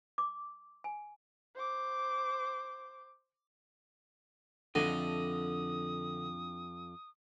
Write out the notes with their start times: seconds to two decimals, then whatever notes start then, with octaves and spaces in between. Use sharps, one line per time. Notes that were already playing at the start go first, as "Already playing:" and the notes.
0.18 D6
0.84 G#5
1.55 C5 D6
4.75 F2 D3 D4 E4 A4 D#5 D#6